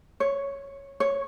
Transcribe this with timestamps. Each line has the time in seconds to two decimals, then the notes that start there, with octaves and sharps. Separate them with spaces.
0.20 C#5
1.00 C#5